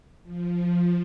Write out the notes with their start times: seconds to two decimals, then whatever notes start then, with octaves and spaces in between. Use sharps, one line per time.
0.23 F3